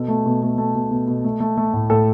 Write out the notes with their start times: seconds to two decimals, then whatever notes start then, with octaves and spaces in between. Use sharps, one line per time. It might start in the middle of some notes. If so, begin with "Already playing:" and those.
Already playing: B2 A4
0.08 A3
0.26 B2
0.42 A3
0.58 A3
0.75 B2
0.91 B2
1.08 B2
1.25 A3
1.40 A3
1.57 A3
1.73 A2
1.90 A2 A4